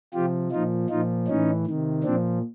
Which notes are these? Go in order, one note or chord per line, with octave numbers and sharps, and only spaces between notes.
C3 F3 F4 G4
A#2 F3 D#4 F4
A#2 F3 D#4 F4
A2 E3 C#4 D#4
C3 D#3
A#2 F3 C4 D4